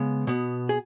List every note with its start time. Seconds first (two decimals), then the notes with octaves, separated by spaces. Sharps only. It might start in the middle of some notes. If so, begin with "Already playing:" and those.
Already playing: C#3 G#3 B3
0.27 B2 B3
0.69 G#4